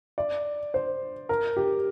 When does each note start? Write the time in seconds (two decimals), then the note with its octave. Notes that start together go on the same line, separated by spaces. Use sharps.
0.18 D5
0.74 C5
1.29 A#4
1.57 G4